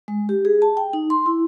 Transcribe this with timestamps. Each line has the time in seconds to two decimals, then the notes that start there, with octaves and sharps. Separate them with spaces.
0.08 G#3
0.29 G4
0.45 G#4
0.62 A5
0.77 G5
0.93 D#4
1.10 C6
1.26 E4